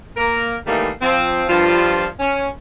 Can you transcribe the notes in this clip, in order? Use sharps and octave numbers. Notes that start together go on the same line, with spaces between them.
A#3 A#4
D#3 E3 G3 A3 A#3 D#4
F3 C4
G2 F3 F4
C#4